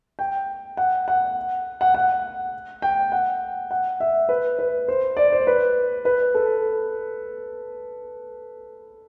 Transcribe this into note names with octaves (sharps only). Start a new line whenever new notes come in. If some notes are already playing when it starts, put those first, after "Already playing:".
G5
F#5
F#5
F#5
F#5
G5
F#5
F#5
E5
B4
B4
C5
D5
C5
B4
B4
A4